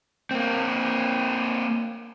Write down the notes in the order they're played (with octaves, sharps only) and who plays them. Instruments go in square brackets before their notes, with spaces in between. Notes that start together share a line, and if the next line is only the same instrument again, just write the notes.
[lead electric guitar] A#3 C4